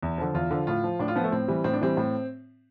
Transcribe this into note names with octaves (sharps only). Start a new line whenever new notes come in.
E2
D3 F3
E2 F4
D3 F3
A2 F4
F3
A2 D4
F4
F3 B3
A3
A2 C4
E3 G3
A2 C4
D4
E3 G3 C4
A2